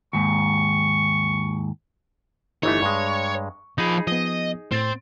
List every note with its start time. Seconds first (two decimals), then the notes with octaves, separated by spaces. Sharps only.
0.13 D#2 G#2 C#6
2.63 G1 E3 A3 D#4 E4 C#5
2.82 G2 G#3 C#6
3.78 F3 D#4 G#4 B5
4.07 F3 B3 D#5
4.72 A2 C4 A6